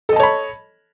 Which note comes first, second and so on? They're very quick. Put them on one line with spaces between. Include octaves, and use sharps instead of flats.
A4 D#5 A5 C#5 B5